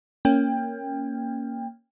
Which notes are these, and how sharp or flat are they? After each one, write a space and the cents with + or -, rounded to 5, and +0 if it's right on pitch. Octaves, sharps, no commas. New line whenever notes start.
A#3 +0 C#4 +0 G5 +20